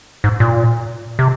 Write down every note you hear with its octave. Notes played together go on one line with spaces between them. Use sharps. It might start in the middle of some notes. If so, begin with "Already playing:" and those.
G#2
A#2
C3